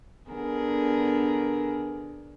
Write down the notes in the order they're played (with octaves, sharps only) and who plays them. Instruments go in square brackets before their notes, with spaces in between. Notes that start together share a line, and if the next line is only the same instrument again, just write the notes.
[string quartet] D3 B3 G#4 A#4